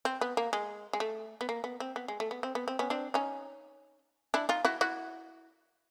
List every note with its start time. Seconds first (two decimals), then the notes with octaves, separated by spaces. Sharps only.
0.05 C4
0.21 B3
0.37 A#3
0.53 G#3
0.93 G#3
1.00 A3
1.41 B3
1.49 A#3
1.64 B3
1.80 C4
1.96 B3
2.08 G#3
2.20 A3
2.31 B3
2.43 C4
2.55 B3
2.68 C4
2.79 B3 C#4
2.90 C4 D4
3.14 C#4 D#4
4.34 D4 E4
4.49 D#4 F4
4.65 E4 F#4
4.81 E4 F#4